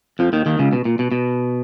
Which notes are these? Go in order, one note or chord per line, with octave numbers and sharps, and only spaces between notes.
F2 F3
D#2 D#3
D#2 D#3
C#2 C#3
B2
A#2
B2
B2